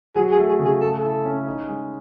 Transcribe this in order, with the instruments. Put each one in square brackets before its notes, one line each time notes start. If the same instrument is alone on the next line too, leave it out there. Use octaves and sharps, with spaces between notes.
[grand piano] F#3 [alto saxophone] G#4
[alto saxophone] G#4
[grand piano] A3
[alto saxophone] G#4
[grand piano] C#3
[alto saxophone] G#4
[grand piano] A3 [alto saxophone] A4
[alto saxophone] A4
[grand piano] E4
C#4
D#4
G#3